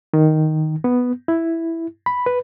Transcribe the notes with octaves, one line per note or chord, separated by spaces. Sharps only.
D#3
B3
E4
B5
B4